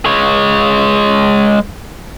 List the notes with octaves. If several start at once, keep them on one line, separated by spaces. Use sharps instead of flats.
G#3 C#5